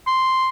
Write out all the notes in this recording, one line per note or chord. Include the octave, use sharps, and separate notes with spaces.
C6